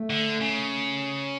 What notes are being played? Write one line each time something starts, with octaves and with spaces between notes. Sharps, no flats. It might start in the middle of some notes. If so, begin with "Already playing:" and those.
Already playing: A3
D3
C#3